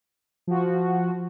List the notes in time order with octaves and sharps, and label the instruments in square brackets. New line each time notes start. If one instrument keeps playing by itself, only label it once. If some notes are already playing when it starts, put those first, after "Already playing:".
[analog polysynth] F3 F#4